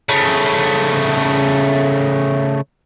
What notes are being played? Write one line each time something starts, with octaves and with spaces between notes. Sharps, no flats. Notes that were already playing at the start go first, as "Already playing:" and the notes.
C#3 A3